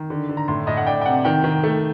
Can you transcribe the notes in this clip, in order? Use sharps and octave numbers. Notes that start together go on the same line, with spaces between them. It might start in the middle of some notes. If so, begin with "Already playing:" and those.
Already playing: D#3
D3
D3
A#5
A2 C6
A2 D#5
F#5
D4 G5
G5
C3 F#5
D#3 G5
D#3
A3